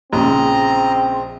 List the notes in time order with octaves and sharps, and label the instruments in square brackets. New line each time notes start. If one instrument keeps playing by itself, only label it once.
[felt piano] A#1 C#3 [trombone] C4 [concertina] D#5 A#5